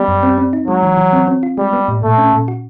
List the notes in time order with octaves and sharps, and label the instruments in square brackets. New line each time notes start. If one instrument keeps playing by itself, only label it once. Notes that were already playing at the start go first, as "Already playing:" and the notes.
Already playing: [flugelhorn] G3 [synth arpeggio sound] B3
[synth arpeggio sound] F#2
C4
C4
D#4
[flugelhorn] F#3 [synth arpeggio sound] G#3
[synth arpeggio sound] E3
E3
C4
C4
F4
[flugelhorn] G3 [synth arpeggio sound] G#3
[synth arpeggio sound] B3
A2
[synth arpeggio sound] A#2 [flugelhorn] A3
[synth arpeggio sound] C#4
A#2
F#4